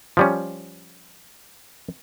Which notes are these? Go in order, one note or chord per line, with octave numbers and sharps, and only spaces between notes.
F3 G3 C#4